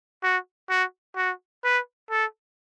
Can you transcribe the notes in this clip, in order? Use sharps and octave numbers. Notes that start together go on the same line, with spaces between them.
F#4
F#4
F#4
B4
A4